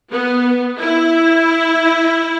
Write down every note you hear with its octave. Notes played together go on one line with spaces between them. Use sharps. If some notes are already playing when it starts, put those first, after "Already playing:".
B3
E4